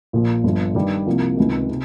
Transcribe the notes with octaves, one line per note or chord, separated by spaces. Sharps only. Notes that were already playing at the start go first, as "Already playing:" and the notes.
A#1 A#2 F3
G1 G2 F3
G2 D#3 G3
C2 C3 F3 A#3
C#2 C3 D#3
C3